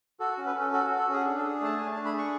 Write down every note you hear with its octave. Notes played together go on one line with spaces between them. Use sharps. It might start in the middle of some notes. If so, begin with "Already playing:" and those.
F#4 A4
C#4
B4
C#4 A4
F#4 A4
A4
F#4
A4
C#4 G#4
D4
A4
G#4
A3 A5
A3 G#5
D4 A5
B5
G#4
C#6